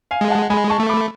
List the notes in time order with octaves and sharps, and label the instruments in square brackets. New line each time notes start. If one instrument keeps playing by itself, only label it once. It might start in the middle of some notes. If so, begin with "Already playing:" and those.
[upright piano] F5 G#5
[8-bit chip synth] G#3
[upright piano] F#5 A5
[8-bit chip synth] G#3 [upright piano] G#5 B5
[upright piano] A5 C#6
[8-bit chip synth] A3
[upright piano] B5 D6